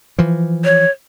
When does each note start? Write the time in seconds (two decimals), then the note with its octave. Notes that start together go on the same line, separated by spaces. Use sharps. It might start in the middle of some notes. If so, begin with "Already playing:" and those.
0.18 E3 F3
0.64 C#5